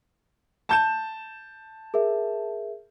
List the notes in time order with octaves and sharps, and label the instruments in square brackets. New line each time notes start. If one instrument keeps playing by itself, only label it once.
[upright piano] A5 G6 E7
[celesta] G#4 A#4 E5